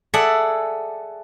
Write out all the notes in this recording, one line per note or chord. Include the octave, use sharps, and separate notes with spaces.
G#4 A4 D5 E5 F#5